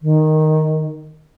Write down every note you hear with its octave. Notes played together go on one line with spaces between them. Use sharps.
D#3